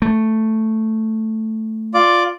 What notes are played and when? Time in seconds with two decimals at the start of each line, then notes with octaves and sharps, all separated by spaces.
0.02 A3
1.94 F4 D5 D6